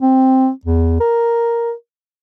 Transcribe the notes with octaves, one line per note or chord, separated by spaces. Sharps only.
C4
E2
A#4